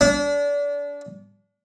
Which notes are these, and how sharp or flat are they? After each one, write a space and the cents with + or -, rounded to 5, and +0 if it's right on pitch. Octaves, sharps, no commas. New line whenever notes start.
D4 -30